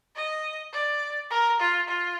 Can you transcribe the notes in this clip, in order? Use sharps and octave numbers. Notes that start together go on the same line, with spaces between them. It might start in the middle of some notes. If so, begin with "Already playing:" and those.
D#5
D5
A#4
F4
F4